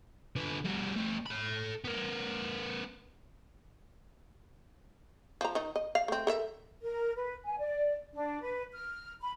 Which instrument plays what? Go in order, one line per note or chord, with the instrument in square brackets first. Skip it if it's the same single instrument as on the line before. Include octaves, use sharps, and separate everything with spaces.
[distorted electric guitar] D3 B4
G3 F#4
A3 G4
A4 B5
B3 A#4
[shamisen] F3 A#5
D#3 D#4
D#5
F5
A3 C4
A4 A#4 E5
[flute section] A#4
B4
G#5
D5
D4
B4
F6
B5